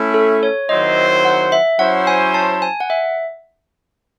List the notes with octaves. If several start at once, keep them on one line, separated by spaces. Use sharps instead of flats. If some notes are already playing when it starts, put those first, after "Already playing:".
Already playing: A3 C#4 E4
A4
C#5
D#3 F#3 C4 E4 C5 D#5
F#5
E5
F#3 C#4 E4 C5 F#5
G#5
A5
G#5
F#5
E5